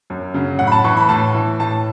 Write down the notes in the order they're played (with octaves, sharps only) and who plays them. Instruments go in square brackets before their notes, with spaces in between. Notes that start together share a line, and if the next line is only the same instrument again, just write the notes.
[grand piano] F#2
C#3 F#3
A2 F#5
B5
A5
E3 C#6
B5
A2 A5
E3
A2 A5